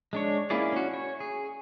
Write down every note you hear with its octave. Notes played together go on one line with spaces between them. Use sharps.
G#3 D4 C#5
A#3 C#4 E4 G#4 D5
C#4 F#4
C#5
G#4